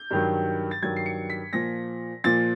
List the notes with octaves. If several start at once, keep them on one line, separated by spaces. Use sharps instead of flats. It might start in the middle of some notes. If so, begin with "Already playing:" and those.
Already playing: G6
G2 D#3 F#3
A6
G2 D#3 F#3 G#6
C7
C#7
B6
A#2 F3 A#6
A#2 F3 A6